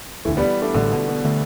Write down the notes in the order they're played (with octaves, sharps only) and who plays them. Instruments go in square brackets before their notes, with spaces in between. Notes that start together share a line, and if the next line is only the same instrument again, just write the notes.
[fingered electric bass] E1 D2 D3 [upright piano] E3 A3
[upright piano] G3 B3
A3 D4
[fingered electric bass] A1 A2 G3 D4 [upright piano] D3
[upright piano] B2
B2
[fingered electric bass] D3 A3